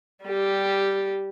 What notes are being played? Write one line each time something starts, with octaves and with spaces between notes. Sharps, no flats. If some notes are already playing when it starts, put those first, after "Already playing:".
G3 G4